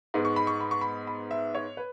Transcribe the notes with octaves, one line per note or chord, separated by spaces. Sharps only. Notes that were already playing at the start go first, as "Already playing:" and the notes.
G#2 G#3 B3
C#6
B5
C#6
B5
C#6
B5
B5
E5
C#5
B4